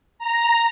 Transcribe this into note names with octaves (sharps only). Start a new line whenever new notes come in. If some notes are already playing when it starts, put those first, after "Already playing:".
A#5